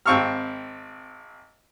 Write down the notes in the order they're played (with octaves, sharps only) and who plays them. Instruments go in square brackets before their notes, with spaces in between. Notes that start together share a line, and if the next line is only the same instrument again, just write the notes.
[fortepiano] G#1 C4 F5 C#6 E6 F6